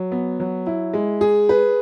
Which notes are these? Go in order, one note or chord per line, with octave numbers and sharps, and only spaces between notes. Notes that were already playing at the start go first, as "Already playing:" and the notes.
Already playing: F#3
B3
F#3
E4
G#3
G#4
B4